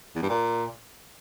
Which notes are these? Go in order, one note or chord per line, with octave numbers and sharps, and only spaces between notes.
E2
G2
A#2